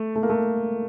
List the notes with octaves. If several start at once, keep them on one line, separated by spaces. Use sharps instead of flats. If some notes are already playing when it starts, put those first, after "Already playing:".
Already playing: A3
A3
A#3
A3